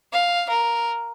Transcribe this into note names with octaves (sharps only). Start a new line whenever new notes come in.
F5
A#4